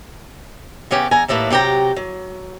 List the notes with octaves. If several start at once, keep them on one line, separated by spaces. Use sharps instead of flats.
C#3 B3 C#4 G4 C#5
E2 G#5 A#5
D#2 A2 A3 A#3 B4
C3 F#3 G4 G5 A#5
F#3